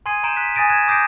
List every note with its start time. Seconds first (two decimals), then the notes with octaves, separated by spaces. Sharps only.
0.06 G#5 C6 D#6 G#6 C7 D#7
0.24 A#5 C6 G6 D7 E7
0.37 C6 F#6 B6
0.55 G#5 D#6 A6 A#6 D7 D#7
0.70 F#6 G#6 E7
0.88 D6 D#6 G6 A#6 C7 D7